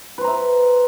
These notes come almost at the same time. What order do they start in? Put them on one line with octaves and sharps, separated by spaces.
B4 C5 A#5 E5